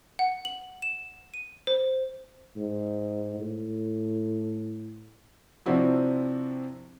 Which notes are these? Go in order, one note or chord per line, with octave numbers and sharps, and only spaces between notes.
F#5
F#7
E7
D#7
C5
G#2
A2
C3 F3 C4 D4 E4 F#4